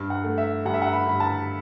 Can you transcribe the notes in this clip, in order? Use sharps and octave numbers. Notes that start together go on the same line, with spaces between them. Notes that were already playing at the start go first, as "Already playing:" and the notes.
Already playing: G2
F#5
A3
E5
G2 F#5
E5
F#5
B5
G2 B5
A5